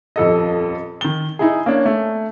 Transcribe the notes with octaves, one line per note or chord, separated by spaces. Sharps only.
D#1 F2 A4 D#5
D#3 G7
D#4 E4 G#4
A#3 C#4 D4
A3